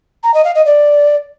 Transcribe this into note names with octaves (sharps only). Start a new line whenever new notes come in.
A#5
D#5
F5
D#5
D5